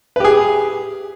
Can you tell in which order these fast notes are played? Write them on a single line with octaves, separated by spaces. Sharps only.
B4 G4 G#4